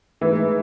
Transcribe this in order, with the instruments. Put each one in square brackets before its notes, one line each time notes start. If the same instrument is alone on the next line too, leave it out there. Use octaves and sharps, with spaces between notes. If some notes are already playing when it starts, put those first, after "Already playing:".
[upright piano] A2 G#3 D#4 G#4 [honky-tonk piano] E3